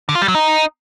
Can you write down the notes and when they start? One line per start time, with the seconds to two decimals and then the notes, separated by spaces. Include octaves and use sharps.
0.09 D3
0.15 F4
0.22 G3
0.28 F#3
0.35 D#4